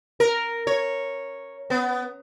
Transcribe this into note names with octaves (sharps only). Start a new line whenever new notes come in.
A#4
C#5
B3